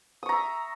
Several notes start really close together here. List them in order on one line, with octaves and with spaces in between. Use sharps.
D#6 C#6 A#5 E5